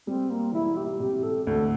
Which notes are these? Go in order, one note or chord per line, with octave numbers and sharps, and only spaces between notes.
G3 C4
A#3
E1 E4
G4
C3 G4
A4
D2 A4